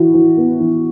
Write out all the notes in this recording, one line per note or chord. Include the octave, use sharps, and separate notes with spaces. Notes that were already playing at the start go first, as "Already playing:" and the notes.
Already playing: E3 F#4
E3
B3
E3